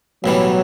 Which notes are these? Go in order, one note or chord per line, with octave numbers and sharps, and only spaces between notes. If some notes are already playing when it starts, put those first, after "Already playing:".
B1 A2 E3 F#3 G3